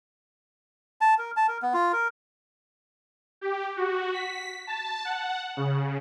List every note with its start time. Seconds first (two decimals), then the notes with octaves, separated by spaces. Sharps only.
1.01 A5
1.18 A#4
1.37 A5
1.49 A#4
1.62 B3
1.74 F4
1.93 A#4
3.41 G4
3.77 F#4
4.13 B6
4.67 A5
5.05 F#5
5.57 C#3